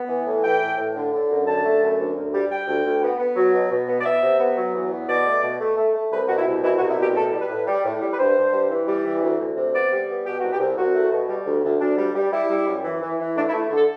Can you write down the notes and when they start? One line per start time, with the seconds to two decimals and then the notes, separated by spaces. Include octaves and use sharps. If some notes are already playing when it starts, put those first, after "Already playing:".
Already playing: B3
0.09 E3
0.26 A2
0.44 E3 G5
0.61 A2
0.78 A2
0.96 D3
1.13 D3
1.30 F#2
1.47 D3 A5
1.64 A3
1.82 F#2
1.99 D2
2.16 D2
2.33 G3
2.51 G3 G5
2.68 D2
2.84 D2
3.03 B3
3.19 B3
3.36 F#3
3.54 B2
3.71 B2
3.89 B3
4.00 D5
4.05 B3 E5
4.23 C3
4.40 B3
4.57 F#3
4.75 E2
4.91 B3
5.09 B2 D5
5.26 A3
5.43 B2
5.61 A3
5.77 A3
5.95 A3
6.12 C2 B4
6.28 B2 F#4
6.38 E4
6.47 C2
6.63 B2 E4
6.77 F#4
6.81 C2
6.89 E4
6.98 B2 G4
7.15 A2 A4
7.33 G3
7.41 B4
7.50 A2
7.67 G3
7.85 A2
8.02 G3
8.12 B4
8.19 G2 C5
8.36 G2
8.53 G3
8.71 E3
8.88 G3
9.05 E3
9.22 D2
9.40 D2
9.57 C3
9.74 B3 D5
9.92 G3
10.09 B3
10.25 B2 G4
10.39 C2 F#4
10.53 G4
10.60 C2
10.77 C2 F#4
10.95 A3
11.12 B2
11.29 G3
11.46 D2
11.64 D2
11.81 D2 D4
11.98 G3
12.15 G3
12.32 G3 E4
12.50 G3
12.67 F#2
12.84 E3
13.01 E3
13.19 E3
13.36 A3 D4
13.49 E4
13.53 A3
13.70 D3 A4